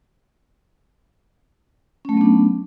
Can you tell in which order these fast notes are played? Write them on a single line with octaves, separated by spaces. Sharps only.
C#4 A3 F#3 B3 D4